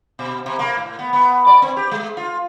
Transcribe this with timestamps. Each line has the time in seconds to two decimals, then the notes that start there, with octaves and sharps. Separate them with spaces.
0.19 B2
0.46 C3
0.59 A#3
0.77 A2
0.99 B3
1.13 B3
1.47 D5
1.62 C4
1.77 G4
1.92 G#3
2.17 F4